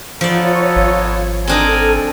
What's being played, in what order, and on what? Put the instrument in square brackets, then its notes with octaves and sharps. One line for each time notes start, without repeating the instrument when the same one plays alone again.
[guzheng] F3 D5 [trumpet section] B3 D#4 A4 [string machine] F4 C#5
[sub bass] G#1
[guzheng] C4 D4 D#4 [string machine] A4 [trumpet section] A#4 G#5